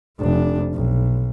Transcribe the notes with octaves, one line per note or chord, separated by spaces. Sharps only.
F1 D4
B1